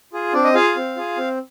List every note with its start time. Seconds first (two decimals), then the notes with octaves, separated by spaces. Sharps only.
0.13 F4 G#4
0.33 C4 D4 D5
0.44 D#5
0.54 F4 G#4 F5
0.76 C4
0.96 F4 G#4
1.18 C4